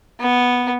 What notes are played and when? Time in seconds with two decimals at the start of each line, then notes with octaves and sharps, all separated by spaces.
0.20 B3